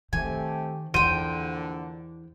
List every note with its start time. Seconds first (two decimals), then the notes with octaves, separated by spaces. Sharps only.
0.13 D#3 A3 C4 G4 G#5
0.94 A#1 E2 D3 C5 G5 D#7